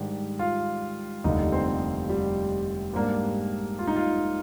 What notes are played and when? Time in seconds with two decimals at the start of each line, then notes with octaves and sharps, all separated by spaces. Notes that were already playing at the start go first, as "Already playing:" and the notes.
Already playing: G#2 D#3 G3 D4 G4
0.39 F4 F5
1.24 F1 D#2 D3 G3 D#4 D#5
1.52 C4 C5
2.09 G3 G4
2.94 G#2 G3 A#3 D4
3.79 F4
3.87 D#4
3.96 F4